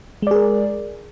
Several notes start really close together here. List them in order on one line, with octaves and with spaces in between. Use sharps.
G#3 D5 G#4 A#4